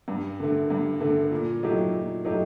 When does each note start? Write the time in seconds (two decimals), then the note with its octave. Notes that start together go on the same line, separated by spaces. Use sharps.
0.08 G2
0.40 D3 A3
0.70 G2
1.00 D3 A3
1.32 A#2
1.63 F#3 A3 D#4 G4
1.93 A#2
2.25 F#3 A3 D#4 G4